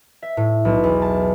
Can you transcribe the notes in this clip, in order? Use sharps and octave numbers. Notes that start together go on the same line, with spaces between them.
E5
A2
B1
E2
A5